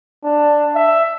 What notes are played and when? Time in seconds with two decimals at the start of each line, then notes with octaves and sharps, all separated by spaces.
0.24 D4
0.75 E5